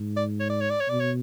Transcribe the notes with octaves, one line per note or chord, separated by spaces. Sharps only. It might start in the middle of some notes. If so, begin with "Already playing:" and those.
Already playing: G#2
D5
C#5
D5
C#5
D5
C#5
B2 D5
C#5